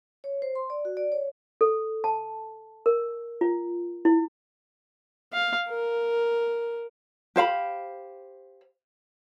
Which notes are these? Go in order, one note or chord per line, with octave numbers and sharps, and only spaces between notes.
C#5
C5
C6
D5
F#4
D5
C#5
A4
A5
A#4
F4
E4
F5
A#4
G4 C5 F5 B5